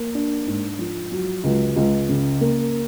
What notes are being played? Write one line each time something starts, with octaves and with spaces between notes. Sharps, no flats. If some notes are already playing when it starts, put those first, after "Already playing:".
Already playing: A#3
D4
G#2
F3
F#3
C#2
C#2
C#3
A#3